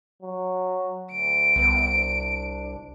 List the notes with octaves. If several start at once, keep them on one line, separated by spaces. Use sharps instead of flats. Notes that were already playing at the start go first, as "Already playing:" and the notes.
F#3
D2 D7
C2 B3
D4